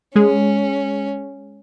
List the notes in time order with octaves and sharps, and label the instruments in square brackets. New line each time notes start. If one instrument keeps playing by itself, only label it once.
[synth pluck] G#3 G#4 [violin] C#4